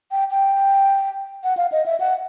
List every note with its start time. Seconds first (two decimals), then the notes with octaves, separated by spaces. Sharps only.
0.11 G5
0.31 G5
1.44 F#5
1.57 F5
1.72 D#5
1.86 E5
2.00 F#5